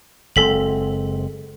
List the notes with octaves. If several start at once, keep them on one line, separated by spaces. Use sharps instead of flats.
F#1 G#3 C4 A4 B6 F#7